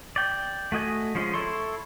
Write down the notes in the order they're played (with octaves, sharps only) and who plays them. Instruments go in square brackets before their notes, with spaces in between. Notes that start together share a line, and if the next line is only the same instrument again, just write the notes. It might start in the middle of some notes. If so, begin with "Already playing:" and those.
[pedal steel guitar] D5 G5
A3 F#4 D#5 G#5
F3 G#3 C#4
E4 A4 C#5 C6